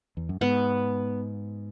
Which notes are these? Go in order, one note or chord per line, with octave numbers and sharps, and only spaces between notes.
E2
F#2
G#2 B3